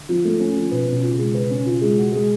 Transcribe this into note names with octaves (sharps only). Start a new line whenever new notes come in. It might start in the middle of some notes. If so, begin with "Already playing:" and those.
Already playing: D3
F3
A3
C#4
F3
B2 B4
B2 C#4
F4
C#3
G#3
B4
C#4
F4
G#3
F#4
G#3